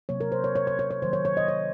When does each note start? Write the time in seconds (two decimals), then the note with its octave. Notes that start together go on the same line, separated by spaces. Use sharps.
0.09 C3 F#3 A#3 C#5
0.21 A#4
0.32 C5
0.44 C#5
0.56 C#5
0.67 C#5
0.79 C#5
0.91 C#5
1.02 D#3 F#3 A#3 C5
1.13 C#5
1.25 C#5
1.37 D#5
1.48 C#5